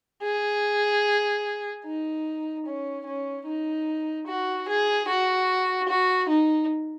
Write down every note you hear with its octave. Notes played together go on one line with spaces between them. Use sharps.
G#4
D#4
C#4
C#4
D#4
F#4
G#4
F#4
F#4
D#4